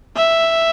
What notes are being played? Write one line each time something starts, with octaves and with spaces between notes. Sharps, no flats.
E5